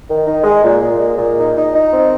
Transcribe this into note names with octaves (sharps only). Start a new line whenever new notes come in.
D#3
D#4
G#3
A#2
A#2
G#3
A#2
D#4
D#4
D#4
C4